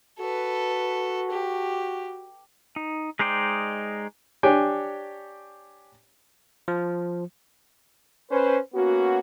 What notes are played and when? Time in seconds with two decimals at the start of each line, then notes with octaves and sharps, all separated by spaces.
0.19 F#4 A4 B4
1.31 G4
2.76 D#4
3.19 G#3 D#4 C5 D5 G5
4.43 D4 G4 C#5 G5 G#5
6.68 F3
8.31 C#4 B4 C5
8.74 A#3 B3 C#4 F#4